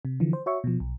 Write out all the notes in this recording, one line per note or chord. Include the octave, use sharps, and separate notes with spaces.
C3
D3 E3 F3
C5
F#4 C#5 E5 C#6
B2 F3
B1